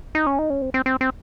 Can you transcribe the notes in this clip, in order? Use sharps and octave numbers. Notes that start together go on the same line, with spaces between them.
D#4
C#4
D#4
C#4
C4
C4
C4
C4